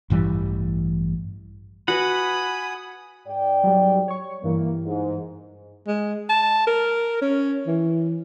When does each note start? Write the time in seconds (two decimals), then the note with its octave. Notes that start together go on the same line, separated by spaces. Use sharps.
0.10 A1 G2 E3 G3
1.88 F#4 B4 F#5 G#5 B5 D#6
3.27 G#2 D5 G5
3.64 F#3 G3
4.08 C#5 C#6
4.44 G2 E3 A#3
4.86 G#2
5.87 G#3
6.29 A5
6.67 A#4
7.22 C#4
7.67 E3